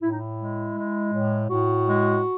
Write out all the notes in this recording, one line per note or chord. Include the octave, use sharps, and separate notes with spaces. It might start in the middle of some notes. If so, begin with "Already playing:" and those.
A2 E4
D#4
E4
G#3
G#3
A2
A2 F#4
G#3